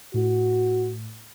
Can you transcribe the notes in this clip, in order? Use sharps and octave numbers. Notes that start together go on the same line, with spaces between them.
A2 F#4